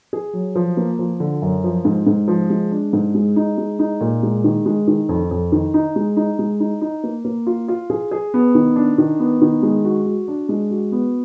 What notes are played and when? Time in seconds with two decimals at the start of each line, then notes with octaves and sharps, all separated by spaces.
0.13 G#4
0.33 F#3
0.55 F3
0.77 A#3
0.99 F3
1.20 D3
1.42 F#2
1.64 F3
1.85 G#2
2.07 G#2
2.28 F3
2.50 G#3
2.71 D4
2.93 G#2
3.15 G#3
3.36 D#4
3.58 G#3
3.79 D#4
4.01 A#2
4.23 G#3
4.44 D#3
4.66 G#3
4.87 D#3
5.09 F2
5.31 F2
5.52 D#3
5.74 D#4
5.96 G#3
6.17 D#4
6.39 G#3
6.60 D#4
6.81 D#4
7.04 A#3
7.25 A#3
7.47 F4
7.68 F4
7.90 G#4
8.12 G#4
8.34 B3
8.55 D#3
8.76 D4
8.98 D#3
9.19 B3
9.42 D#3
9.63 G#3
9.85 F#4
10.06 F#4
10.28 D4
10.49 G#3
10.71 F#4
10.92 B3